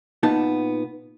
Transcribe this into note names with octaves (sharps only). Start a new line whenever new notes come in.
A#2 B3 D#4 A5